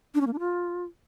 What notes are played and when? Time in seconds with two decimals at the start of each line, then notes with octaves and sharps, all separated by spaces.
0.15 D4
0.21 C#4
0.27 A#3
0.33 D4
0.39 F4